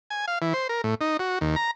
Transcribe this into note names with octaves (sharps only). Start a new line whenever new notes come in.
G#5
F5
E3
C5
A#4
A2
D#4
F#4
D#2
A#5